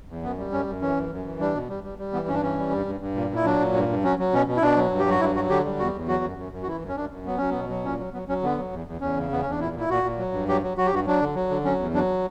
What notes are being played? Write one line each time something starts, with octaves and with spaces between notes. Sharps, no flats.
E2
F#2 B3
G3
F#2 C#4
F#2
E3 C#4
F#2
F#2
E3
G3 D4
B2
G3
G3
G3
E3 B3
G2 C#4
D4
E3 C#4
G3
G2
G2
G2
A#2
A#2 E4
F#3 D4
A#2
G2
G2
F#3 C#4
F#3
B2 C#4
B2
E4
B2 D4
F#3
G2
G4
F#3 F#4
G2 E4
F#3 F#4
D3 G4
G3
E2 F#4
E2
F#3 F#4
F#2
F#2
F#2
F#4
E3 E4
F#2
C#4
F#2 D4
F#2
F#3 B3
F#3 C#4
B3
B2
F#3
A#2 C#4
F#3
F#3 B3
F#3 C#4
D3 B3
F#3
E2
E2
E2 C#4
C#3
E2 B3
C#4
E2 D4
A#2 E4
A#2
E4
A#2 F#4
A#2
F#3
G2
F#3 G4
F#3
F#3 F#4
G4
G2 F#4
F#3 D4
D3
F#3
D3
F#3 C#4
E2
F#3 D4